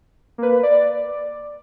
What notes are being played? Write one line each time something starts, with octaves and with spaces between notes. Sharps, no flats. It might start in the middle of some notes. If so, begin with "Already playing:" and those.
A#3 B4
D5